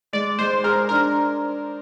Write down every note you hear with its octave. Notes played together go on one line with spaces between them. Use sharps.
G#3 D5
G#3 C5
G#4 A#4
D4 A#4